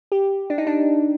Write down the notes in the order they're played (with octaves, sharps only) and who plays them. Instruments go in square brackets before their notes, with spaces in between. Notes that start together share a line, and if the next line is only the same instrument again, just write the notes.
[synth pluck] G4
D4
D#4
D4